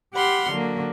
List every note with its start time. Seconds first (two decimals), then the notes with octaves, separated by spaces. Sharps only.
0.15 G4 F#5 B5 C6 F6
0.51 D3 F#3 A#3